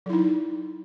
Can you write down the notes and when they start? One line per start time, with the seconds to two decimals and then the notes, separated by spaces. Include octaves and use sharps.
0.06 F#3
0.10 E4
0.13 D#4